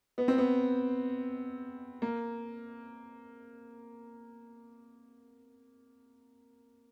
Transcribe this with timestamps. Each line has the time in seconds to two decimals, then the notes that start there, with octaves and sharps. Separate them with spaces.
0.18 B3
0.28 C4
0.38 B3
2.02 A#3